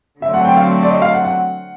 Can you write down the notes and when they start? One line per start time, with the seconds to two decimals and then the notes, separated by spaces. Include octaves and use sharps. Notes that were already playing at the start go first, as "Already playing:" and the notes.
0.22 D3 F#3 A3 C4 E5
0.34 F#5
0.45 G5
0.57 F5
0.83 D5
0.90 D#5
1.02 F5
1.14 F#5
1.25 F#5